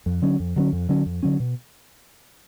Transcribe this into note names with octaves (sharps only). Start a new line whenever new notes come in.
F2
D3 F#3 C#4
F2
D3 F#3 C#4
F2
D3 F#3 C#4
F2
D3 F#3 C#4
B2